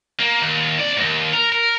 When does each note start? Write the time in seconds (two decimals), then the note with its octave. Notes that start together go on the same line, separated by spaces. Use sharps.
0.20 A#3
0.41 D#2
0.79 C2 D5
0.97 D#2 G#2
1.33 A#4
1.52 A#4